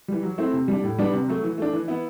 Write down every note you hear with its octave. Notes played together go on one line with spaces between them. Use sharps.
E3 G3
F#3
A3 C4 E4
C3
G3 D4
A2
G3 B3 D4
C3
F#3 A3
E3
A3 D4
E3
B3 E4